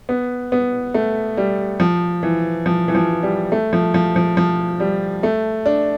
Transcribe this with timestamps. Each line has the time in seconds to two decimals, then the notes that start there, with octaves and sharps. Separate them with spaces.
0.09 B3
0.52 B3
0.94 A3
1.37 G3
1.80 F3
2.23 E3
2.66 F3
2.88 E3
2.95 F3
3.23 G3
3.52 A3
3.73 F3
3.94 F3
4.16 F3
4.37 F3
4.80 G3
5.23 A3
5.66 D4